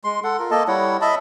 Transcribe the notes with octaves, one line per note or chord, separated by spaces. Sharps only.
G#3 C6
A4 F#5
F4 A#4
A#3 A4 D#5 A5
G3 E4 C#5 F#5
D#5 E5 A5 B5